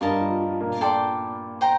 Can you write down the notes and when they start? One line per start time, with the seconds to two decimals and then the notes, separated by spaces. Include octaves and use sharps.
0.01 G2 G3 F4 A#4 D#5 A5
0.21 F3
0.41 F3
0.60 A#2 A#3
0.81 A4 D5 G5 C6
1.61 C5 G5 A#5